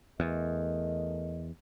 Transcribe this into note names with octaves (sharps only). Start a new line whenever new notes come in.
E2 A3 A#4 D#5